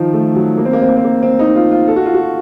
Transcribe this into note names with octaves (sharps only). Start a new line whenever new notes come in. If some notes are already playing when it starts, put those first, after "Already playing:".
Already playing: D#3 F3
A3
F#3
A#3
C4
A#3
C4
A#3
C4
A#3
C4
D#4
F4
F4
A4
F#4
F4
F#4